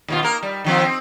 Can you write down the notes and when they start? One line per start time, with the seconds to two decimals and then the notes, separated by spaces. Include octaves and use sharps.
0.08 D#2 B2 F4
0.23 A#3 A#4
0.43 G3
0.64 D#3 F3 C4
0.84 C4